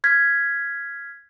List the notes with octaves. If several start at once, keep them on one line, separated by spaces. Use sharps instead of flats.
F6 G#6 B6